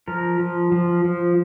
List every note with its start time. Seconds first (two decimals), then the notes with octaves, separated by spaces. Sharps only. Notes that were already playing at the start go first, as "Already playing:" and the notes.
0.08 F3 A#4
0.40 F3
0.72 F3
1.04 F3